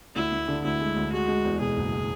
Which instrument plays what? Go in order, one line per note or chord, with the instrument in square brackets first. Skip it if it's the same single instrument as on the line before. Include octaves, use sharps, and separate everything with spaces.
[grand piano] D2 [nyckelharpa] E4
[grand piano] D2
D3
[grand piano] D2 [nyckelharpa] E4
[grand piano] G#3
D2
[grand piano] G#3 [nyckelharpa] F#4
[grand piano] G#3
E2
[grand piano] B2 [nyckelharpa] G#4
[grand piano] F#1